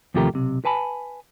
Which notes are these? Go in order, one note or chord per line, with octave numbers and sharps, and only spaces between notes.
D#2 C3 F3 A3 G4 A#4
B1 C3
B4 G#5 A5 B5